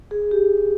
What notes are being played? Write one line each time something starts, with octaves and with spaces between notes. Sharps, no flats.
G#4
G4